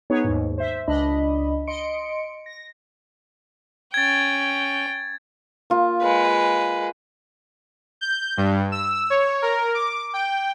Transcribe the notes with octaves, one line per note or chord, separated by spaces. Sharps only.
B3 D#4 G#4 B4 C#5
D#2 G#2
C5 E5
C#2 D4 D#5 B5
D#5 C6 C#7 D7
A#6
C#4 G5 G#6 A6
A#3 F4
G#3 B4
G6
G2
E6
C#5
A#4
D6
G5